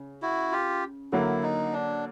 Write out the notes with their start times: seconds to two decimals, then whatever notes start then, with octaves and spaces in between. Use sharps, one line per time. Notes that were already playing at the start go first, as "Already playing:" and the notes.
Already playing: C#3
0.22 E4 F#4
0.52 F4 G4
1.12 D3 F#3 A#3 E4
1.43 D#4
1.73 D4